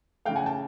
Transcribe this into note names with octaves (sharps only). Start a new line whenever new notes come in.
C#3 E3 A3 F5 G5
F#5 G#5
G5 A5